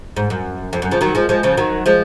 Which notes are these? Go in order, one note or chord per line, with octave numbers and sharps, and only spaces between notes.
G#2
F#2
F2
F#2
C#3 F3
D#3 F#3
F3 G#3
F3 G#3
C#3 F3
D#3 F#3
F3 G#3